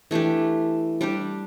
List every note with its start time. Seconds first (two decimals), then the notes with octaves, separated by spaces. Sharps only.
0.11 E3 A3 D4 G4
1.01 G3 D4 G4